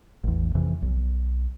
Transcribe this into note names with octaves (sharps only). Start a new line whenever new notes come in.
A1 E2
F2 C3 E3
B1